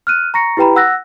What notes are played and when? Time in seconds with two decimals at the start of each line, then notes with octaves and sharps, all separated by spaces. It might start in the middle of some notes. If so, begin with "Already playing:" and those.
0.07 F6 F#6 D#7
0.34 A#5 C#6 A#6 C#7
0.57 E4 G4 B4 G5 A#5 B5
0.76 F#5 E6 F#6 A#6